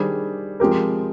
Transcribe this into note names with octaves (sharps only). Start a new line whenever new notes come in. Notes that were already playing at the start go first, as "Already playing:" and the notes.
Already playing: D#3 G3 D4 G#4 C5
F3 G#3 C4 G4 A#4